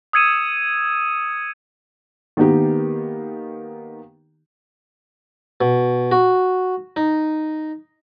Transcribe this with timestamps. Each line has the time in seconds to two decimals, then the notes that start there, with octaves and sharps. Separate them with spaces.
0.13 D#6 E6 G#6 C#7 D#7 E7
2.37 D#3 A#3 B3 D#4 G4
5.61 B2
6.12 F#4
6.96 D#4